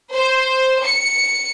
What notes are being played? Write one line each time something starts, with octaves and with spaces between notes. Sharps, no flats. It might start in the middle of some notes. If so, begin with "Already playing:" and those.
C5
C#7